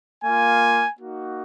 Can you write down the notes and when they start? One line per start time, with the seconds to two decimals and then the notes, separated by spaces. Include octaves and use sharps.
0.24 A#3 F4 G#5
0.98 A#3 D#4 F#4